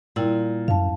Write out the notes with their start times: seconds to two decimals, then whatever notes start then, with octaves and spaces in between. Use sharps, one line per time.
0.16 A#2 G3 E4 G5
0.68 F#2 F5 A5